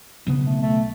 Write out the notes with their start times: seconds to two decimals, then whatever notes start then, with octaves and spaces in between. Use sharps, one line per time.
0.27 B1 C#3 B3
0.45 A3
0.62 A3